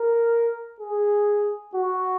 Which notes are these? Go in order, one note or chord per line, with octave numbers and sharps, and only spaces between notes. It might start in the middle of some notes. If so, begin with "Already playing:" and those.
Already playing: A#4
G#4
F#4